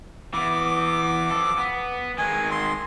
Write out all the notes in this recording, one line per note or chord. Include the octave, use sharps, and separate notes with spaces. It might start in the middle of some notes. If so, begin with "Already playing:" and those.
E3 B3 D6
F3 A4
B3
D#3 G#3 G#5
C6